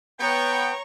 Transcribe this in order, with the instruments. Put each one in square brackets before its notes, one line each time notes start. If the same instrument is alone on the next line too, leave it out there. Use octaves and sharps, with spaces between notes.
[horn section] B3 G5 [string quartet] C#5 A#5 C#6